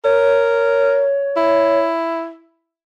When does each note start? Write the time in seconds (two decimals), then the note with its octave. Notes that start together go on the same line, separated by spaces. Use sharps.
0.04 A#4 C#5
1.37 E4